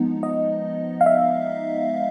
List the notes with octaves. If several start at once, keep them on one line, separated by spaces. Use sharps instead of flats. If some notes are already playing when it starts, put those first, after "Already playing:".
Already playing: F3 G#3 B3 D#4
D#5
F5
E5